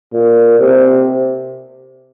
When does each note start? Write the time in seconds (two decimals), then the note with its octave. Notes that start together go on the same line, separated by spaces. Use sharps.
0.13 A#2
0.60 C3